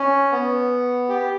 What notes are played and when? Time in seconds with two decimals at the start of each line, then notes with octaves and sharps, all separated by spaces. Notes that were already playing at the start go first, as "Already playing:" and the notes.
Already playing: C#4
0.32 B3
1.09 G4